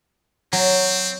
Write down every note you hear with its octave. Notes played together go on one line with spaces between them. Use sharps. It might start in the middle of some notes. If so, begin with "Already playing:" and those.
F#3 C4